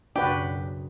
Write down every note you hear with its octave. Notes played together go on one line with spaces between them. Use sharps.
B1 F#2 C#3 D4 F#4 G4 B4